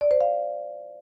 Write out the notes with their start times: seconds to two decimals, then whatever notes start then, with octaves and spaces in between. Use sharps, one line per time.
0.01 D5
0.11 C5
0.21 F5